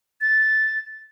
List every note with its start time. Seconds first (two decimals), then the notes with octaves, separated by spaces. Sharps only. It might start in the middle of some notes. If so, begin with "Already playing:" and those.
0.21 A6